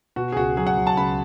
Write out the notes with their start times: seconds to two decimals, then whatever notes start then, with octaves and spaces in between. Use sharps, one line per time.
0.16 B2 F#4
0.32 G#4
0.36 C#2 F#4
0.57 F#3 G#4
0.67 F#5
0.77 F#3
0.87 A5
0.97 C#2 B5